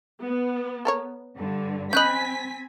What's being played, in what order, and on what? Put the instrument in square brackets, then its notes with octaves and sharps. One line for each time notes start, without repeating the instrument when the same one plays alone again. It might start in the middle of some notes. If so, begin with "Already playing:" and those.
[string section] B3
[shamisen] A4 A#4 C#5
[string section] G2 D3
[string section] C4 G#5 B6 [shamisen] C#4 D#5 [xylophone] B5 F#6 G6